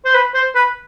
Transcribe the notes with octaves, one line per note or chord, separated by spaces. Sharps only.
C5
B4
C5
B4